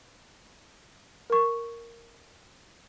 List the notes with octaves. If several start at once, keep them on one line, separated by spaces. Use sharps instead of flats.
A#4 C#6